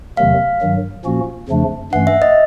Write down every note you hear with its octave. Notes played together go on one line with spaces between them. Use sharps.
E2 C3 D#3 F#3 A3 F5
G2 D#3 F#3
A#2 F3 A#3 C#4 F#4
F2 C#3 F3 A3 D4
G2 E3 A3 C#4 F#5
E5
D#5